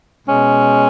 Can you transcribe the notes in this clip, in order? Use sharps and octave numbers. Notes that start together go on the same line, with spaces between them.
B2 G#3 C#4